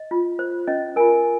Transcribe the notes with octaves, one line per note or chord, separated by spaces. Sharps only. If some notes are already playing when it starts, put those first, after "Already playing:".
Already playing: D#5
F4
C5
C#4 D#5
F4 A#4 G#5